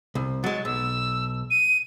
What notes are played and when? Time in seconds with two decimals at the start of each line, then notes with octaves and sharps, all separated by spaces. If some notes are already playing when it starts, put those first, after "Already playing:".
0.15 C2
0.44 F#3 G#3 A6
0.65 B1 E6
1.51 D#7